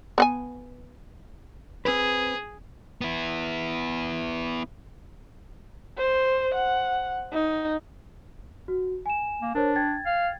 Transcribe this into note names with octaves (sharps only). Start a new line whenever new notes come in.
B3 F#5 G#5
C4 G#4 B4
B3 E4
C5
F#5
D#4
F#4
G#5 E7
A#3
D4 A#4 C5 C#5
G5 G#6 A6
F5